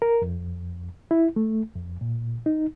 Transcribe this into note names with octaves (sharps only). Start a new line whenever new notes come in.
A#4
F2
E4
A3
F2
A#2
D#4